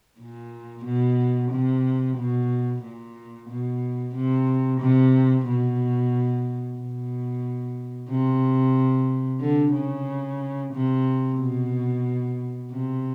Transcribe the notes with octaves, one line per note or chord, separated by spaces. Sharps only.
A#2
B2
C3
B2
A#2
B2
C3
C3
B2
B2
C3
D3
C#3
C3
B2
C3